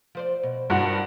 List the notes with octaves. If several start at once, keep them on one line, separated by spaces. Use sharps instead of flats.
F3 C5 D5
B2
G2 F#4 A#4 C5